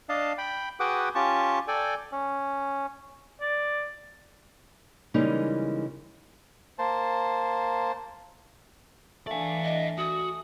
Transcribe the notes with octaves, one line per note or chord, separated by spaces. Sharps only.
D4 D#5 F5 A5
G5 B5
F#4 G#4 B4 F#5 G5 D6
C#4 F4 G4 A5 C#6
A4 D5 G5 G#5
C#4
D5
C#3 E3 G3 G#3 A#3 D#4
A#3 C5 A5
E3 A3 D4 D5 F5 G#5
D#5
F#4 D#6